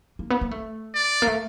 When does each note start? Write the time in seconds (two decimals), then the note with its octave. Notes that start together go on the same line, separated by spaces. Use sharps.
0.19 A#3
0.30 B3
0.41 A#3
0.51 A3
0.95 D5
1.22 A#3
1.27 A3